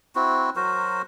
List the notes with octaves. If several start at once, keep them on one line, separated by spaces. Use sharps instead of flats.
C4 E4 F#4
F#3 F#4 A#4 C5